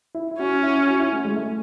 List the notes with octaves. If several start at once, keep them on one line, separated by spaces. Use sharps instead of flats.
E4
E4
C#4 F#4
E4
F#4
E4
A3
G#3
A3